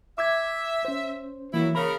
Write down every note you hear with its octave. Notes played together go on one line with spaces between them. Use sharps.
E5 D6 E6 G#6
C#4 C5
E3 F#3 A#3 E4
C#3 A#4 B5